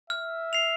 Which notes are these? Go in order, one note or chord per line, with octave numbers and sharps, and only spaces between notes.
E5 F6
C7 F7